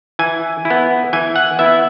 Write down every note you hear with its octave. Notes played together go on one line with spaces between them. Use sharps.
E3 G#5
E4
B3
E3 G#5
F#5
B3 E4 E5